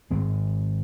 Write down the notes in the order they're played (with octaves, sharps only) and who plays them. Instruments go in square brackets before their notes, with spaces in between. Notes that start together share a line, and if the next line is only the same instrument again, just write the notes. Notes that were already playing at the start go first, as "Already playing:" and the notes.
[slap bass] G#1 G#2 G#3 C4